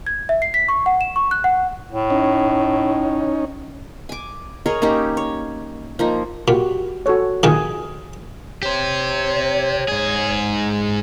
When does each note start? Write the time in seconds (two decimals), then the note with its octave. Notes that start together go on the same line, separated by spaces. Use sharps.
0.07 G#6
0.29 E5
0.42 C7
0.54 B6
0.68 C#6
0.86 F#5
1.01 E7
1.16 C#6
1.31 F#6
1.44 F#5
1.90 A2
2.10 C#4 D#4
4.09 G#5 D6
4.66 G#4 A#4 C#5 D#5
4.82 A#3 C#4 D#4 G4
5.17 C#5
5.99 F3 A#3 D#4
6.48 A#2 F#4 G4
7.06 F#4 A4 C#5
7.43 A#2 D#3 G#4
8.63 G4 C5 C#5
9.88 G#2 G#4